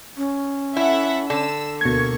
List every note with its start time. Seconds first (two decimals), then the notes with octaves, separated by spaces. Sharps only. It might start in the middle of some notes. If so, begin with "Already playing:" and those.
0.17 C#4
0.77 E4 A4 E5 F#5
1.30 D3 E6
1.81 D2 B2 A#3 C#6 G#6